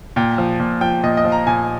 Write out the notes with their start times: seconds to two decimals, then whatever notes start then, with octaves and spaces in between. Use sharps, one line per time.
0.16 A#2 G5
0.38 F3
0.60 A#2
0.81 F3 G5
1.03 A#2 D#5
1.17 D#5
1.25 F3
1.32 A#5
1.47 A#2 G#5